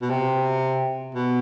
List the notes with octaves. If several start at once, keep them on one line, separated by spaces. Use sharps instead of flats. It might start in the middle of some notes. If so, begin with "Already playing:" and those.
B2
C3
B2